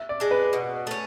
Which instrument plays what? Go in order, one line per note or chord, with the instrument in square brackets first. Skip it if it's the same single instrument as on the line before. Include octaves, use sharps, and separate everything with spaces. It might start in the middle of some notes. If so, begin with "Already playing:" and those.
Already playing: [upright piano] E5
D5
[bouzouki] G#3 D4
[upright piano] B4
[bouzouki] B2
A3 C#4